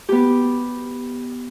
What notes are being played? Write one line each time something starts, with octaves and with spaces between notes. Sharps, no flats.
B3 G4